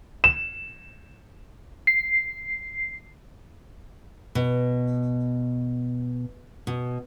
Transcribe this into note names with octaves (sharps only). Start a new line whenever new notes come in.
E7
C7
B2
B2